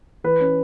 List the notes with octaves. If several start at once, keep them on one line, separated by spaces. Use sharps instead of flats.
E3 B4
C#4